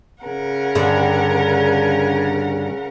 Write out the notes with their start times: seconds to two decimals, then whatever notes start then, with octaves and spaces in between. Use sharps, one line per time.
0.23 C#3 A#4 F#5
0.75 G2 D3